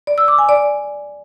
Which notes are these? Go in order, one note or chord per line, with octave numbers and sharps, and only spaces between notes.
D5
E6
D6
G#5
D5